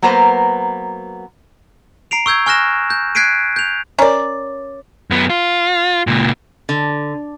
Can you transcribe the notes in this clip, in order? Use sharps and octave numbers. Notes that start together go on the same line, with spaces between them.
F#3 A#3 B3 B4 C5 A#5
A#5 C7 D7 F7
C#6 E6 G6 G#6
G#5 C#6 F6 F#6 A#6 E7
G6
F#6 G#6 B6 C7 D7 D#7
G6 F7
C#4 A#4 C#5 D5 A#5
F#2 B3
F4
C#2 A#2
D3